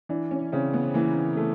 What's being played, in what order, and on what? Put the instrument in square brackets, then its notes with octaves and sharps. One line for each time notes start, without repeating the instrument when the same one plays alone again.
[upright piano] E3 [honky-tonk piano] D4
[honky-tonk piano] C#4
[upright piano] C#3 [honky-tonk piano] C4
[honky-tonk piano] B3
[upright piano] E3 [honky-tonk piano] A#3
[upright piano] A3